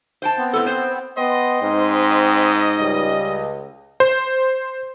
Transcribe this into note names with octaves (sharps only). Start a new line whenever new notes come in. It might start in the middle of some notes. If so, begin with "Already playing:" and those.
C5 G5 A5
B3 C4
A2 A4
C5
B3 D#5 G5 C6
G#2 C4
C#2 G3
C5